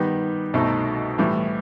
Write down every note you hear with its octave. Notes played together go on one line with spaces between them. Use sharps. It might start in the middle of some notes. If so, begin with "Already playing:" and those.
Already playing: D#3 G3 B3
C2 B2 A3 D#4 A4
A2 E3 G3